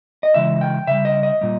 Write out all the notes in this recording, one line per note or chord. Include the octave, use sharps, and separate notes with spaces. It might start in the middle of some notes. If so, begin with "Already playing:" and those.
D#5
C#3 E3 G#3 E5
G5
C#3 G3 E5
D#5
D#5
A#2 G3